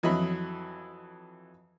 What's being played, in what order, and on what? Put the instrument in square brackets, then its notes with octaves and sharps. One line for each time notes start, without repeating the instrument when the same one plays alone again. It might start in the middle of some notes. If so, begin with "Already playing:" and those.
[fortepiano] F2 E3 F#3 D#5 E5 B5